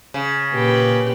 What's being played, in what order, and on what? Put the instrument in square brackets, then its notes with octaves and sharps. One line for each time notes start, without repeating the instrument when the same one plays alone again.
[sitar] C#3
[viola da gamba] A#2 G4 B4